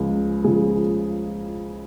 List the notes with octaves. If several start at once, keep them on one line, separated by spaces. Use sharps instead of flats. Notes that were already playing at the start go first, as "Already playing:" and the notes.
Already playing: C#2 C#3 F3
C#2 C#3 F3 G#4